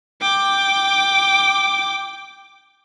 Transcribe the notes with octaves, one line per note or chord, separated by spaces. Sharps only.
G5 D6